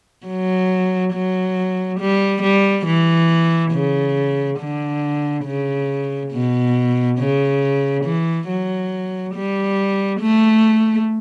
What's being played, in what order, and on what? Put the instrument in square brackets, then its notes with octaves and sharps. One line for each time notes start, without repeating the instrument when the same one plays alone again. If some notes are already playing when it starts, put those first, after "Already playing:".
[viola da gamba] F#3
F#3
G3
G3
E3
C#3
D3
C#3
B2
C#3
E3
F#3
G3
A3